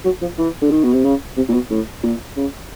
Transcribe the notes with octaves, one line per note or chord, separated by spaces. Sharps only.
F#3
F3
E3
D3
D#3
B2
C3
C#3
C3
A#2
B2
A2
A#2
C#3